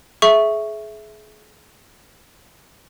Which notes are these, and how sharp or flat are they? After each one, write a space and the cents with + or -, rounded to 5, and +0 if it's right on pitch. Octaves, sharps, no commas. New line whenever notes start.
G#4 +35 E5 +0 C#6 +0